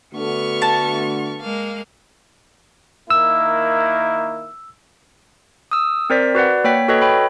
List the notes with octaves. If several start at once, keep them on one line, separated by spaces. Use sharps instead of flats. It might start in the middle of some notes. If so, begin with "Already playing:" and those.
D3 A3 B3 F#4 C#6 F6
A5
G#3 A#3 F5
D#3 A#3 E4 E6
D#6 E6
C4 A#4 C5 D5 B6
F#4 B4 D5 F#5
A#3 C#5 G5 B6
F#4 A4 B4 C#5 D#5
C#5 G5 B5